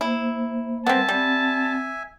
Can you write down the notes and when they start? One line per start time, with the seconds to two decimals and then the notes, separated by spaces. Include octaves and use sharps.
0.01 A#3 E4 C5
0.86 G3 B3 C4 A#4 E5 G#5 A5
1.09 G3 C4 F#5